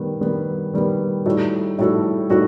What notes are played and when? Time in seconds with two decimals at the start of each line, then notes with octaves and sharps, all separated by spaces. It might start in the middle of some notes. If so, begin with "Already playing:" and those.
Already playing: D#3 G3 B3
0.21 D#3 G3 B3
0.74 D#3 G3 B3
1.25 A2 G3 D#4 F#4 A4
1.78 A2 G3 D#4 F#4 A4
2.29 A2 G3 D#4 F#4 A4